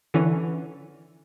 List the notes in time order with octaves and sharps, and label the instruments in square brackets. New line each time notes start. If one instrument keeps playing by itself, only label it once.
[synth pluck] D3 E3 C#4